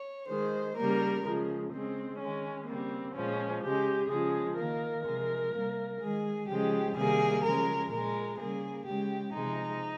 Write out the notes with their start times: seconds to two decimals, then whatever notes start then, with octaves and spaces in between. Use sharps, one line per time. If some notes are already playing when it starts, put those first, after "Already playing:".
Already playing: C#5
0.28 D#3 G#3 C5
0.76 C#3 G3 A#3 A#4
1.24 C#3 F3 G#3
1.71 C#3 G#3 C4
2.19 D#3 G#3 C#4
2.66 C#3 G3 A#3 C4
3.14 A#2 F3 G#3 C#4
3.63 C#3 G#3 G4
4.09 C#3 F3 G#3 G#4
4.58 D#3 A#3 A#4
5.05 C3 F3 G#3
5.53 C3 G3 A#3
6.01 D#3 G#3 G#4
6.48 C#3 F3 G#3 G4
6.96 C3 D#3 G3 A#3 G#4
7.44 C#3 F3 G#3 A#4
7.91 A#2 G#3 A#4
8.39 C#3 G3 A#3 G#4
8.86 C#3 G#3 G4
9.34 C3 F3 G#3 D#4